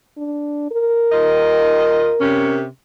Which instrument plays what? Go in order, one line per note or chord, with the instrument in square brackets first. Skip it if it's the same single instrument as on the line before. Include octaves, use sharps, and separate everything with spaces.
[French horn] D4
A#4
[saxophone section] D#2 F4 D#5
C3 C#4